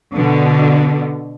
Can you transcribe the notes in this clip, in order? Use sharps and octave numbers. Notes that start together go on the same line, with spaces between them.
B2 D3